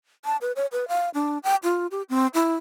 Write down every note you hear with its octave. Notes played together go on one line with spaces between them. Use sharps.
A5
B4
C#5
B4
F5
D4
G5
F4
G4
C4
E4